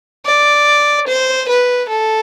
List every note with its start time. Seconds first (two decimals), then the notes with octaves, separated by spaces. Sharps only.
0.26 D5
1.08 C5
1.49 B4
1.89 A4